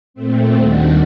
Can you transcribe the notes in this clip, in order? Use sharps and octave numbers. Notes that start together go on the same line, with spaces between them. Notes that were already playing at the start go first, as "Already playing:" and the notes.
A#2 A3 C4
D#2 D#3 G3 D4 F#4